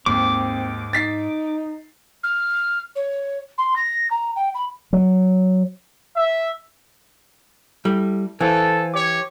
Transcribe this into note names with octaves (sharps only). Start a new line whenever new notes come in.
D#2 G#2 C4 D6
D#4 A6 B6 C7
F6
C#5
C6
A#6
A#5
G5
B5
F#3
E5
G3 E4 A4
E3 A4 C5 F5 G#5
G4 C#5 D6